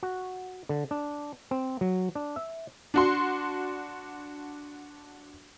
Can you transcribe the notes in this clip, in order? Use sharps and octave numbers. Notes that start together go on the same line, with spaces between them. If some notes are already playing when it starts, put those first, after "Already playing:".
F#4
D3
D4
C4
F#3
D4
E5
D4 F#4 C6